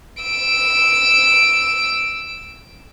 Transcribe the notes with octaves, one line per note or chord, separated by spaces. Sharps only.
E6 D7